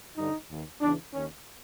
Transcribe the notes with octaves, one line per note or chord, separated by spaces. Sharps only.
G2 D3 D#4
D#2 D#3
E2 C#3 E3 D4
D#2 D#3 C#4